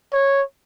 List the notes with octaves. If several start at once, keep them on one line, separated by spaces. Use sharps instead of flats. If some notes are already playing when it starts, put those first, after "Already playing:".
C#5